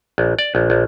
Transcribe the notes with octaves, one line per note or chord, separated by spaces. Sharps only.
A#1
D5
A#1
A#1